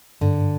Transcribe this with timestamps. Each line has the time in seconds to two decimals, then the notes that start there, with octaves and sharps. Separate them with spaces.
0.21 G2 D3